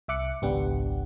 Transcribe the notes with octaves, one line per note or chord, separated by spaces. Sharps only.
C2 E5 D6 F#6 C#7
G#1 C#2 B3 D4 G4 F#5